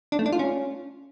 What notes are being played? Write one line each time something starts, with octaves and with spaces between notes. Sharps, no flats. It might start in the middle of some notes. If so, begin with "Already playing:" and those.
D4
A3
D4
F4
C#4